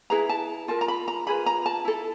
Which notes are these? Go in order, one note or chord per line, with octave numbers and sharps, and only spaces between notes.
E4 G#4 B4 A#5
A5
F4 A#4 A5
A#5
B5
A#5
F4 G#4 B4 B5
A#5
A5
E4 A4